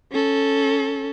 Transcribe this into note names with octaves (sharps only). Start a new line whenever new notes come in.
C#4 A4